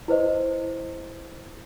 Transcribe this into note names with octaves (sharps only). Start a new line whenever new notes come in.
E4 B4 C5 D#5